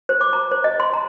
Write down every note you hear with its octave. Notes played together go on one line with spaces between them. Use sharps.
C5
D6
A#5
C5
D#5
C6
A#5